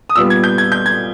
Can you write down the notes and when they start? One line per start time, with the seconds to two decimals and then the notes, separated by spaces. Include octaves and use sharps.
0.09 D#6
0.16 A#2 G3 B3 E6
0.30 G#6
0.44 G6
0.58 G#6
0.72 G6
0.86 G#6